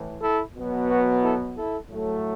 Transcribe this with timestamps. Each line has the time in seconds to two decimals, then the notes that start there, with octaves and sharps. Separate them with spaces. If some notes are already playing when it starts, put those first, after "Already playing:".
Already playing: A2 E3 A3
0.21 E4 A4
0.55 B2 F#3 B3
0.89 F#4 B4
1.23 E4 A4
1.56 E4 A4
1.90 A2 F#3 A3